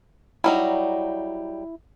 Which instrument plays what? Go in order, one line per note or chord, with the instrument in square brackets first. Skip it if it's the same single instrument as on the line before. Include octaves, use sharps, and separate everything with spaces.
[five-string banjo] F#3 G3 D#4 [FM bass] E4